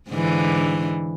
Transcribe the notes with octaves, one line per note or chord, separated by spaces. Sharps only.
G#2 D3 E3